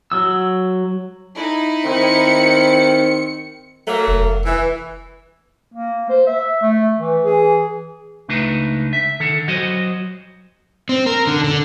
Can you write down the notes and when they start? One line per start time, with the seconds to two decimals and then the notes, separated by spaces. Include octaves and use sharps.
0.12 F#3 E6
1.35 D#4 E4
1.85 D#3 C4 C#7
3.87 F#3 A3 A#3
4.07 F1
4.45 E3
5.72 A#3
6.09 C5
6.26 E5
6.61 A3
6.99 E3
7.25 G#4
8.29 C#2 A3 D4 D#4 B4
8.93 E5
9.20 D3 D#3 A4
9.48 F#3 F#4 C5 D#5
10.89 C4
11.06 A#4
11.27 D3
11.44 D3